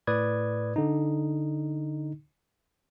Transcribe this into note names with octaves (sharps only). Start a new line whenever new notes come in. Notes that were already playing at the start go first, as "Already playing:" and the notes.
A2 B4 D5 D#6 G#6
D3 D#4